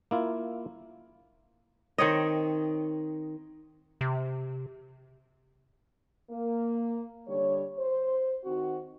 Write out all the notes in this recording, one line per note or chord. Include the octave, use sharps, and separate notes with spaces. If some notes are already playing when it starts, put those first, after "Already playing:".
A#3 E4 F4
D#3 C4 C#5 D#5
C3
A#3
D3 G3 C#5
C5
D#3 C4 F#4